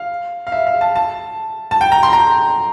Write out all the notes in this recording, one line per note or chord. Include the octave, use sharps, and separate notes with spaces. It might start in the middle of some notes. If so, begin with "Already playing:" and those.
Already playing: F5
F5
E5
F5
A5
A5
A5
G5
A#5
C6
A#5